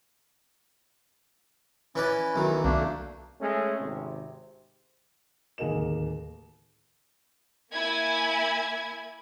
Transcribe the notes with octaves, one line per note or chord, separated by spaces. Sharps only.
E3 C#4 B4 D5
B1 D#3 E3
C2 A3 A#3 D4
G#3 A3 C#4
G#1 C3
D1 D#2 G#4 A#4 D#5 E7
A#3 E4 G#5 G#6